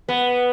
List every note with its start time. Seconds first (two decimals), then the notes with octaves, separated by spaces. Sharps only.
0.09 B3